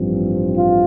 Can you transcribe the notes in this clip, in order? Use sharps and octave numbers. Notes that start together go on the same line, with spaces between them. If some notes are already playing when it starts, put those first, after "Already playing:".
Already playing: A1 G2 F3 C4
F4